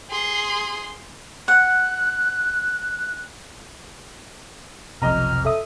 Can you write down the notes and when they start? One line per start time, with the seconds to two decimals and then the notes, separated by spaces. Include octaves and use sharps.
0.10 G#4 C6
1.48 F#5 F#6
5.02 F1 B1 F2 C3 D#5 A#5 F6
5.45 A4 E5 D#6